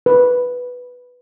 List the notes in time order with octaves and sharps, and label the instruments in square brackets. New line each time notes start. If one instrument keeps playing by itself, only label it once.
[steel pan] B4